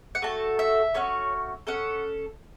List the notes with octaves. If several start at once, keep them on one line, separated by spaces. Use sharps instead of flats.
F#5
A3 F#4 A4 A5
E5
A3 C#4 F#4 C#5
C#4 A4 F#5